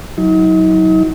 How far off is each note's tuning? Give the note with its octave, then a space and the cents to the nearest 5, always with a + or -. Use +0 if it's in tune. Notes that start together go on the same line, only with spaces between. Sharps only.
F#3 +0 D#4 +40